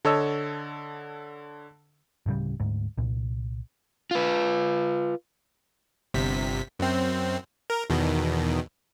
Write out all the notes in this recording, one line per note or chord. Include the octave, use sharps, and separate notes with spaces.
D3 A4 C#5 D#5 E6
D1 A2 C#3 G3
D2 G#2
C2 A#2
F4 B4
G1 C3 B6
F#2 C4
A#4
E2 B2 D#3